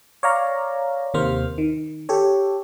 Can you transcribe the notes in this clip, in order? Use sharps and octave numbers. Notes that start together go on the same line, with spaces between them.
C#5 D5 F5 A#5
D#2 C3 A#3 C5 F6
D#3
G4 A4 C#5